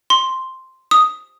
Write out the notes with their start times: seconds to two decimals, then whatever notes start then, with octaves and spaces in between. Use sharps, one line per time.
0.10 C6
0.91 D#6